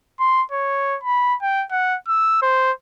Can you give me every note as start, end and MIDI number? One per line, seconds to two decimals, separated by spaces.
0.20 0.43 84
0.51 0.98 73
1.03 1.36 83
1.42 1.65 79
1.71 1.97 78
2.08 2.40 88
2.42 2.72 72